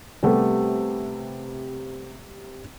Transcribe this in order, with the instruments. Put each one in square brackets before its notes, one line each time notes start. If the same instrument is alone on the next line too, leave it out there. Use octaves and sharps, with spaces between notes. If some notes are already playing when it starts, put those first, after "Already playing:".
[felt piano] C3 G3 A3 B3